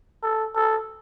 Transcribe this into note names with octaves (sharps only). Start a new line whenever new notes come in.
A4
A4